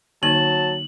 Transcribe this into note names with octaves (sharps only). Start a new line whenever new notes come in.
D3 F#3 A#3 D#4 A5 F#7